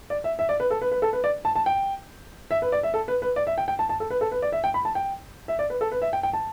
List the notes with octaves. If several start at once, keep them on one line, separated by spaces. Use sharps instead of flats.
D5
E5
E5
D5
B4
A4
B4
B4
A4
B4
D5
A5
A5
G5
E5
B4
D5
E5
A4
B4
B4
D5
E5
G5
G5
A5
A5
A4
B4
A4
B4
D5
E5
G5
B5
A5
G5
E5
D5
B4
A4
B4
E5
G5
G5
A5